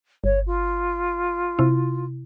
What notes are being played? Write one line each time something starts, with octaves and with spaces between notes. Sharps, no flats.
G1 C#5
F4
C3 E4